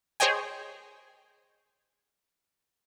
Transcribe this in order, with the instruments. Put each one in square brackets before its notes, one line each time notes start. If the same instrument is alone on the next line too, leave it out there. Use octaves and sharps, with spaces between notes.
[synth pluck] G#4 C5 C#5 D#5 G5 G#5